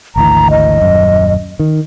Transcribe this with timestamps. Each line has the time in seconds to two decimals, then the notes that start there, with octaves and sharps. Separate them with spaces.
0.16 G#1 D2 E3 A#5
0.50 D#5
0.81 D#1 F#2
1.60 D#3